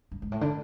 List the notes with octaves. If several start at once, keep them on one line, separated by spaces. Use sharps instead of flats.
G2
G#2
A2
D3